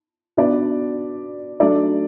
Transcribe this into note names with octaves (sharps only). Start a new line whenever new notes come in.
B3 D4 F#4 B4 D5
F#3 A3 D4 A4 D5